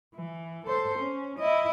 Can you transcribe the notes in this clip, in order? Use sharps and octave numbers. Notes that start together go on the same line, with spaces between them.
E3
A4 C5
C#4
E4 D#5